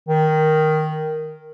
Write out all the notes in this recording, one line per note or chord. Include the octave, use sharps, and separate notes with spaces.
D#3